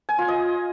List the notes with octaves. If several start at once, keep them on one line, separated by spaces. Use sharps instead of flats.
G#5
F4
D#5